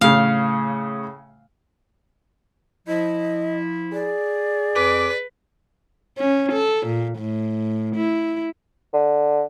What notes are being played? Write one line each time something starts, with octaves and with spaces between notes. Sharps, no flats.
A2 C#3 F5
F3 E4 D#5
G#4 D5
F2 B4 D6
C#4
A4
A#2
A2
E4
D3